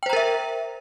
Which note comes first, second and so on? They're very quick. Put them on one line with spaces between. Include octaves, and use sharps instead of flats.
G5 C5 A#5 A#4 E5